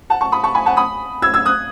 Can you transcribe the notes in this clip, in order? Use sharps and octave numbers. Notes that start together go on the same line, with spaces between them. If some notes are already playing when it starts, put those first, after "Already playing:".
F#5 A5
A5 C#6
B5 D#6
A5 C#6
G#5 B5
F#5 A5
B5 D#6
E6 G#6
E6 G#6
D#6 F#6